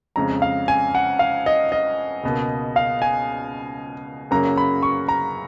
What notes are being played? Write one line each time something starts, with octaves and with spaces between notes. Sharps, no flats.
F2 C#3 G#3 A#5
F5
G#5
F#5
F5
D#5
D#5
C#2 B2 A#3
F5
G#5
F#2 C#3 F#3 A#3 A#5
B5
C#6
A#5